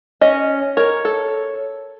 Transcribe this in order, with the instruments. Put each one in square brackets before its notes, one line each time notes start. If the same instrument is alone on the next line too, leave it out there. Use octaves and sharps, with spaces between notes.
[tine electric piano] C#4 [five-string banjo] D#5
[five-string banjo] A#4 [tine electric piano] C#5
[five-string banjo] A4